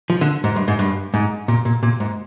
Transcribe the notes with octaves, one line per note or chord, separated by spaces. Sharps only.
F3
D3
G#2
G2
G#2
G2
G#2
A#2
A#2
A#2
G#2